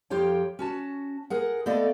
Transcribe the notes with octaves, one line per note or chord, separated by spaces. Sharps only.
F2 F3 F4 G4 C#5 G5
C#4 F#4 A5
G#4 A#4 F#5
A3 B3 A4 D5 D#5 F5